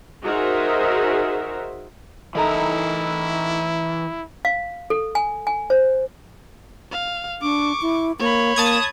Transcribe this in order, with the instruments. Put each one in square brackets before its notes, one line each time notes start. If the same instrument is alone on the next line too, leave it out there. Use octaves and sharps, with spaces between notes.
[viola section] D#4 F#4 G#4 A#4 C5 E5
[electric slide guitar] E3 A#4 [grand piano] D#4 A4 A#5 [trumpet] E4
[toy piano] F5
A4
G#5
G#5
C5
[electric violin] F5
[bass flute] D4 [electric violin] C#6 D6
[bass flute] E4
[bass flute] A#3 [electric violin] C#5 B5
[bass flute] A#3 [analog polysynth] A5 D#6 G#6